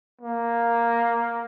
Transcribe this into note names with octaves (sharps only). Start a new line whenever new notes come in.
A#3